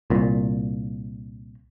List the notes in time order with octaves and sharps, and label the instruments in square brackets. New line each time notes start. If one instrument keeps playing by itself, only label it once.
[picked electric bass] C2 A#2